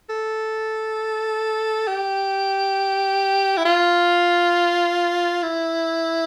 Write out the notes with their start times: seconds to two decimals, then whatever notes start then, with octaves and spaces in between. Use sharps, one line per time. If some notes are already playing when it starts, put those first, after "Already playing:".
0.10 A4
1.88 G4
3.57 E4
3.65 F4
5.43 E4